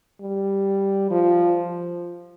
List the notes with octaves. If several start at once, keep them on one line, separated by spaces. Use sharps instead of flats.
G3
F3